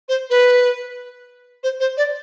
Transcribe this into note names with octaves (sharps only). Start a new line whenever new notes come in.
C5
B4
C5
C5
D5